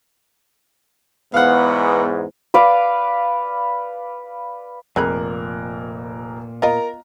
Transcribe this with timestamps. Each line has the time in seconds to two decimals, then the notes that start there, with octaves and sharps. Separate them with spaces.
1.34 E2 G#2 B3 F5 F#5
2.54 B4 D5 F5
4.96 F1 A#2 C4 G#4 A#4 B5 F#6
6.62 B3 F4 A#4 D#5 A#5